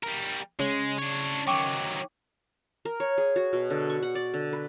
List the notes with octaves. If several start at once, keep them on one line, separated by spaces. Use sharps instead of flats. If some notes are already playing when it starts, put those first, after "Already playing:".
G3 A#4
C#3 G#3 C#4
D4 C#5
D#3 F#3 G5 C#6 D6
A#4
C#5
G#4
F#4
B2
D3
C#6
F#5
D5
D3
B4